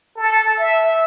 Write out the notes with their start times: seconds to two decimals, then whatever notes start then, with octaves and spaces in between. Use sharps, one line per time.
0.16 A4
0.59 E5